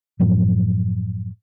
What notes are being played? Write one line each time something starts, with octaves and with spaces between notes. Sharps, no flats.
F#2 A2 F3 F#3